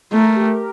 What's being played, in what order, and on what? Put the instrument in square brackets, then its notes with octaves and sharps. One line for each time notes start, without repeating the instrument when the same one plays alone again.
[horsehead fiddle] A3 [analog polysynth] A#4
[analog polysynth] G4